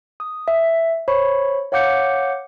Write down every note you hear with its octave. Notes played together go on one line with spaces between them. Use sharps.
D#6
E5
C5 C#5 B5 C#6
C#5 F5 F#5 D6 G6 C#7